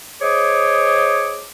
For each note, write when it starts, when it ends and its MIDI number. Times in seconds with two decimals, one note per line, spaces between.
0.21 1.45 68
0.21 1.45 72
0.21 1.45 73
0.21 1.45 75
0.21 1.45 86